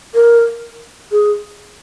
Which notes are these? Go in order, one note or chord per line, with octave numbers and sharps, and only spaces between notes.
A#4
G#4